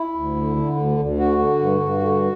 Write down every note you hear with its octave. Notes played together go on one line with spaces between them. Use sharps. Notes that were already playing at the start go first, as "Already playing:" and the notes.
Already playing: E4
D2
D3
D3
D2
D2
D3 F#4
D3
G2
G2
D3